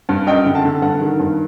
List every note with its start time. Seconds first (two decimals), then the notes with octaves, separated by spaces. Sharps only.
0.09 G2
0.27 F#2 D#5 G5
0.45 D3
0.54 F#5 A5
0.64 D3
0.82 G2 F#5 A5
1.01 D#3
1.19 G2